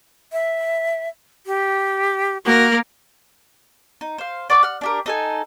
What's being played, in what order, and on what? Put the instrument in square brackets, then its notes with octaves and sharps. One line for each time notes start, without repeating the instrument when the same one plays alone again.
[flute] E5
G4
[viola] A#3 A#4 [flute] F#4
[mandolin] D#4
C5 F5
D5 F#5 C#6 D6
F#5 F6
D4 G4 A#4
D#4 A4 G#5